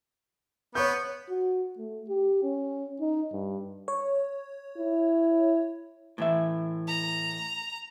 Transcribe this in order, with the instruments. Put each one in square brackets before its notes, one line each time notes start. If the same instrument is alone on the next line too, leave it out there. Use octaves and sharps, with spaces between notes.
[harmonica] B3 [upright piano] C#5 C#6 G6
[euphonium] F#4
A3
G4
C#4
D#4
G2
[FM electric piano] C#5
[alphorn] E4
[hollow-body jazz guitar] A2 E3 E5
[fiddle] A#5